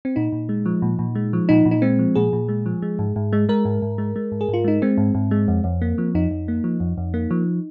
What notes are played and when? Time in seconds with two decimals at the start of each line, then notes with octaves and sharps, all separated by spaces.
0.05 C4
0.16 A#2 D#4
0.32 A#2
0.49 G#3
0.66 F3
0.82 A#2
0.99 A#2
1.15 G#3
1.33 F3
1.49 A#2 D#4
1.65 A#2
1.71 D#4
1.82 G#3 C4
1.99 F3
2.15 A#2 G#4
2.33 A#2
2.49 G#3
2.66 F3
2.82 G#3
2.99 G#2
3.16 G#2
3.33 G#3
3.49 G#3 A#4
3.65 G#2
3.82 G#2
3.98 G#3
4.16 G#3
4.32 G#2
4.41 G#4
4.48 G#2
4.54 F4
4.64 G#3 D#4
4.82 G#3 C4
4.98 G#2
5.15 G#2
5.31 G#3
5.48 F2
5.64 F2
5.82 A#3
5.98 F3
6.15 F2 D#4
6.31 F2
6.48 A#3
6.64 F3
6.80 F2
6.98 F2
7.14 A#3
7.31 F3